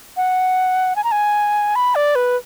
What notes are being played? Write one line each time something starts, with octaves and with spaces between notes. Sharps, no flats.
F#5
G#5
A#5
G#5
B5
D5
B4